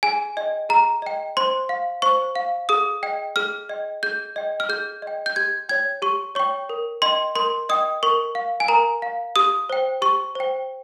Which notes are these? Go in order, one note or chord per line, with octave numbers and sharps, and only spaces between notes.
G#4 G#5
D#5 G5
G#4 A#5
D#5 G5
C5 C6
F5
C5 C#6
F5
G#4 D#6
D#5 G5
G#4 F6
D#5 G5
G#4 G6
D#5 G5
F6
G#4 G6
D#5 G5
G6
G4 G#6
C#5 G5 G#6
G4 C#6
C#5 G5 C#6
A#4
D#5 G5 C6
A#4 C6
D#5 G5 D#6
A#4 C#6
F5
G#5
A#4 A#5
F5
G4 D#6
C5 G5
G4 C#6
C5 G5